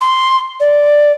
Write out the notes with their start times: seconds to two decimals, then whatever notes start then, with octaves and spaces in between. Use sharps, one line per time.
0.01 C6
0.60 D5